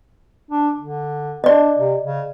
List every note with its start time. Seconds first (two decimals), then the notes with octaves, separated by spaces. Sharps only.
0.51 D4
0.80 D3
1.44 D4 D5 D#5
1.78 C3
2.04 C#3